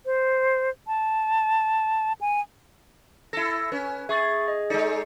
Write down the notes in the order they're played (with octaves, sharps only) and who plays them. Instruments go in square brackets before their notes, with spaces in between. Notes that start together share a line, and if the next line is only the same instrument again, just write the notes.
[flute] C5
A5
G#5
[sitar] E4 A4 [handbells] A#6
[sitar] C#4 [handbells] B4
[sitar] G#4 [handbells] E5 C#6 A6
[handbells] D#5
[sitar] G#3 D#4 [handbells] A4 D5 C#7